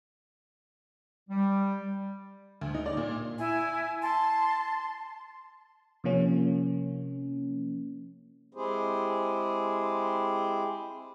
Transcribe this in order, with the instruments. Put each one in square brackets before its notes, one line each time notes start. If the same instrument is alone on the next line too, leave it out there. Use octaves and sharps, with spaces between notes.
[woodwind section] G3
[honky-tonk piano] D2
D#4
D5
A#2
[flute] E4 [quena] G#5
[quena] A5 [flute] C6
[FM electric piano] C3 F3 A#3 C#4
[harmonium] G#3 C4 E4 G4 G#4 C5